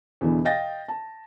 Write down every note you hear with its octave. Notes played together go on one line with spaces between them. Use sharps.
E2 B2 D3 E3
D#5 F5 G5 A6 A#6
A5